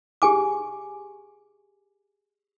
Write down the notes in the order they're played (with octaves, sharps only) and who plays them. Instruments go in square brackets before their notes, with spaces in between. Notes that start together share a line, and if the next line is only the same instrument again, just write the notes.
[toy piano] G4 G#4 G#5 D6